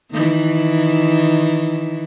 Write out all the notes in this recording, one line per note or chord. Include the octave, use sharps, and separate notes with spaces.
D#3 E3